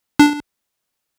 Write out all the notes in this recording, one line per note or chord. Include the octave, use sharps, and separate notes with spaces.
D4